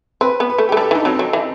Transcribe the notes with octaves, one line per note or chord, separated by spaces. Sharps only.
C4 B4
B3
B4
A3
A3 G4
G3 A4
E3
D#4
F#3 C4
F#3
E3